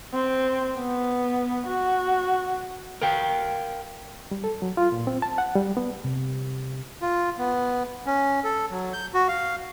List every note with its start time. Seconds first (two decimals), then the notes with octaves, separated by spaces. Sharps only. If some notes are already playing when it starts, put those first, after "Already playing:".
0.14 C4
0.77 B3
1.67 F#4
3.02 A#4 F5 G5
4.31 G3
4.44 A4
4.62 F#3
4.77 F4
4.92 A#2
5.07 C4
5.22 A5
5.38 F#5
5.56 G3
5.77 B3
6.04 C3
7.02 F4
7.38 B3
8.06 C#4
8.44 A4
8.71 F#3
8.93 G6
9.14 F#4
9.28 F5